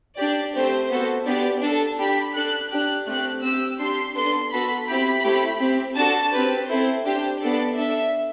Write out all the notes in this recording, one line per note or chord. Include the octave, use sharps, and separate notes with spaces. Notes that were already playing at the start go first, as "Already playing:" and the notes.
D4 G4 D5
A3 C4 G4 C5
B3 F#4 A4
B3 D4 G4 D5
D4 A4 A5
D4 G4 B5
D4 A4 F#6
D4 G4 F#6
A3 C4 G4 F#6
C4 G4 E6
D4 G4 C6
B3 D4 A4 C6
B3 F#4 A4 B5
C4 E4 G4 B5
A3 C4 E4 G4
C4 G4
D4 F#4 A4 A5
C4 G4 B4
C4 E4 A4 C5
D4 G4 C5
B3 D4 A4 D5
D4 A4 E5